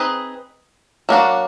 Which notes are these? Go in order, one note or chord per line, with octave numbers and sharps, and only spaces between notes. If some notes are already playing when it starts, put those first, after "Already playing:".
Already playing: C4 D#4 G#4 B4 D#5
F#3 A#3 D4 F#4